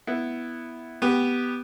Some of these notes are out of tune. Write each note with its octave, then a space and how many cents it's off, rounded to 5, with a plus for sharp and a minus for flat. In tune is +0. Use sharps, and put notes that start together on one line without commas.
B3 +0 E4 +0
B3 +0 G4 +0